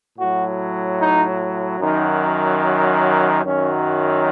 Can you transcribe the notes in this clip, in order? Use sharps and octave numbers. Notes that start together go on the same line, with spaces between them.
A2 F#4
F#3
D#4
F#2 D#3 F#3 D#4
F#2 D#3 F#3 C#4